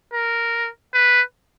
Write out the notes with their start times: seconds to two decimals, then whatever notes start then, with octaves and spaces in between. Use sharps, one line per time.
0.13 A#4
0.94 B4